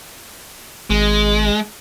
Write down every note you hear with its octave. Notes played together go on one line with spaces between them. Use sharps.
G#1 G#3